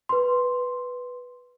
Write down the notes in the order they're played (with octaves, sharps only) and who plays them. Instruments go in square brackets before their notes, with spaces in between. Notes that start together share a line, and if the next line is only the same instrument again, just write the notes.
[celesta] B4 C6